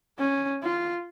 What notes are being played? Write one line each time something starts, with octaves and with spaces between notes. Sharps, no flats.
C#4
F4